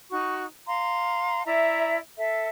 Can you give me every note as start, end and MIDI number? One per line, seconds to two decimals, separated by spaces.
0.11 0.44 63
0.11 0.44 66
0.11 0.44 85
0.66 1.44 77
0.66 1.44 82
0.66 1.44 84
1.46 1.98 64
1.46 1.98 74
1.46 1.98 76
1.46 1.98 82
2.16 2.49 69
2.16 2.49 76